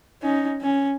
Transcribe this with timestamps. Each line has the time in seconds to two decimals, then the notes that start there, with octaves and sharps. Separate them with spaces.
0.22 C#4 D#4
0.62 C#4